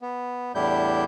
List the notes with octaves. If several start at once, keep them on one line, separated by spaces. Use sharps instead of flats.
B3
E2 A2 G3 D4 E4 G6